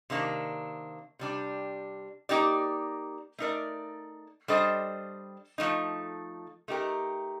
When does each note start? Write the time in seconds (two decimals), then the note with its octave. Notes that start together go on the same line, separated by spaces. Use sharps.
0.10 C3 D#3 A#3 D4
1.19 C3 G3 D4
2.29 A#3 D#4 G4 D5
3.38 A3 D#4 A#4 D5
4.48 G3 D4 A4 C5 D#5
5.58 F3 A3 D#4
6.68 A3 D#4 G4 A#4